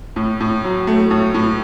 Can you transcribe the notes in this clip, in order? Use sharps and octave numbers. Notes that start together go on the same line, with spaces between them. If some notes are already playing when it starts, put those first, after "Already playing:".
A2
A2
F#3
A3
A2
A2